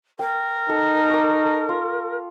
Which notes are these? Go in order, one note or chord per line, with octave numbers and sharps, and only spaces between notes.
A#4 G5
D#4 A4
C#6 D6
F4